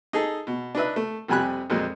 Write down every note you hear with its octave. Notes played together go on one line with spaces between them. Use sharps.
D#4 G#4 A4
B2
D4 D#4 B4 E5
A3
F2 C3 G3 G#5 B5 F#6
F2 A#2 F#3 G#3